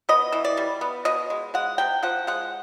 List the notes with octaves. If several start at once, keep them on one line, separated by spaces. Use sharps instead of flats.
B3 D#5
E3
D5
G3
B3
B2 D#5
G#3
G#3 F#5
C3 G5
F3 F#5
G#3 F#5